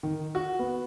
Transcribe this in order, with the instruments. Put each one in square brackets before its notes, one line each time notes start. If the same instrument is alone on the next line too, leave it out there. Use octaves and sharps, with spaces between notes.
[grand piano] D#3
F#4
B3